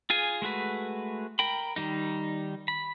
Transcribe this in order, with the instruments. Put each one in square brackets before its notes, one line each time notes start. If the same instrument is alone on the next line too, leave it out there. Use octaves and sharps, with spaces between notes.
[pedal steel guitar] F4 G#4 G#5
G#3 A3 F#4 B4
A#4 G5 B5
D#3 G3 D#4
B5